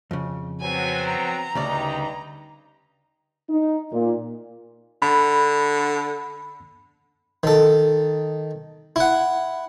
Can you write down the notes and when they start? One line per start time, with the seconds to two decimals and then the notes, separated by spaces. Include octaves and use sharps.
0.11 F2 C#3
0.61 F#3 B3 C4 G#5
1.07 A#5
1.55 D2 G2 C#3 G3 D#4 D5
3.50 D#4
3.92 A#2
5.02 D3 B5
7.43 D#3 A4
8.96 E4 F#5